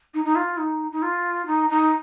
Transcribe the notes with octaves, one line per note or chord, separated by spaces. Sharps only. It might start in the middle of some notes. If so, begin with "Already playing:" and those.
D#4
D#4
F4
D#4
D#4
F4
D#4
D#4